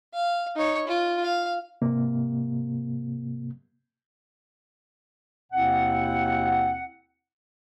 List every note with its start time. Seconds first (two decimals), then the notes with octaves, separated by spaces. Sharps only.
0.13 F5
0.56 D#4 C#5
0.88 F4
1.23 F5
1.82 G#2 C3 A#3
5.53 D#2 B2 C4 E4 F#5